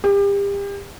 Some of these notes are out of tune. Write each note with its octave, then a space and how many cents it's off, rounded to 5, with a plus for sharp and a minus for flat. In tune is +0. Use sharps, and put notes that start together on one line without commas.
G4 +35